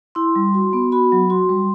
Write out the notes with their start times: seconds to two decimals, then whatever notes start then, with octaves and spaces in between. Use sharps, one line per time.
0.15 E4 C6
0.36 G3
0.54 F#4
0.73 B3
0.92 F#4 B5
1.12 F#3
1.30 F#4 C6
1.49 G3